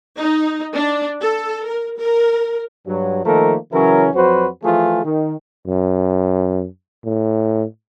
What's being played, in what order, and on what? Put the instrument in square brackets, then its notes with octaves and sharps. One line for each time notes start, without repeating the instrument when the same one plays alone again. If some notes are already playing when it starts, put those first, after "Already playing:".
[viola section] D#4
D4
A4
A#4
A#4
[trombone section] G2 F#3
D#3 F3 A3 A#3 A4 A#4
C#3 E3 F#3 C#4 E4 A#4
F2 F#3 F#4 B4 C5
E3 F3 A3 F4 G#4
D#3
[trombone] F#2
A2